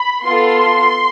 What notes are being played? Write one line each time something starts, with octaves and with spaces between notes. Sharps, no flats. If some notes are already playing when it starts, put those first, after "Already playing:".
Already playing: B5
B3 F4 A4 C6